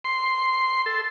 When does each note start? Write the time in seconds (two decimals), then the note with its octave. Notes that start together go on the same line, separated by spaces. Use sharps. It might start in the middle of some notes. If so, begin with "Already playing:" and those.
0.05 C6
0.86 A4